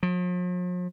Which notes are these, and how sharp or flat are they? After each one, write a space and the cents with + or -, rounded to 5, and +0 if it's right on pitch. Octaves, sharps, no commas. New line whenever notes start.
F3 +45